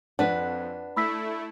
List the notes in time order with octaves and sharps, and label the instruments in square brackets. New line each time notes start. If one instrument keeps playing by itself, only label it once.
[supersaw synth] F2 [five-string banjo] D4 [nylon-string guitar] B4 F#5
[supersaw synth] A3 E4 [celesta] B5 E6 B6